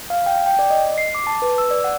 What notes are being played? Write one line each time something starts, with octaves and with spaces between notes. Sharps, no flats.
F5
G5
G5
D5
D#5
C7
D6
A5
B4
E6
D5
F#5